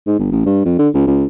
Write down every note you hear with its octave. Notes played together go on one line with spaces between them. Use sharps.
G#2
G1
A1
G2
F2
D3
C#2
C#2